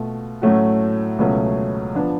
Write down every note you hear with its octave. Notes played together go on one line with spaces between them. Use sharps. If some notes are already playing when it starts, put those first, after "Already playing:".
Already playing: B2 A3 F4
A2 F#3 A3 C#4 F#4
C#2 B2 F#3 A3 C#4
F3 B3 D4